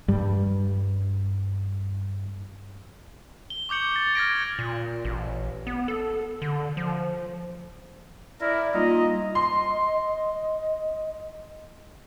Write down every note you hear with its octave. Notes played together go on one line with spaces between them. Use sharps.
G2 G3
G7
C#6 D6 G6 C#7 F#7
A6
F6 G#6 A#6 D7
A#2
A1
B3
A4
D3
F3
E4 A#4 D5
G3 A#3 D#4 F4 D#5 A#5
D#5 C6